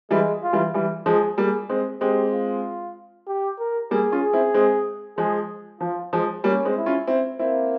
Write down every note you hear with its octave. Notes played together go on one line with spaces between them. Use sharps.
E3 G3 G#3
F4
E3 G3
E3 G3
F3 G#3 G#4
G3 A#3 G#4
G#3 C4
G#3 C4 G4
F4
G4
A#4
G3 A#3 G#4
C#4 F4
G#4
C4 E4
G#3 C4
F3 G#3 G#4
F3 F4
F3 G#3
G3 A#3 C#4
G#3 C4
E4
C#4 F4
C4 E4
A#3 C4 E4